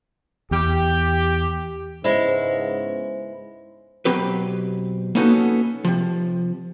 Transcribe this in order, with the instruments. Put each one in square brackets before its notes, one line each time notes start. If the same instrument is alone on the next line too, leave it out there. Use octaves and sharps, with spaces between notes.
[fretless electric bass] E2 [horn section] G4
[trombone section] G#2 C#3 B3 [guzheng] G#3 E4 [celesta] C5
[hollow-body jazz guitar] B2 F#3 C4 G4 B4
A#3 B3 C#4 D#4 F#4 A4
C3 F3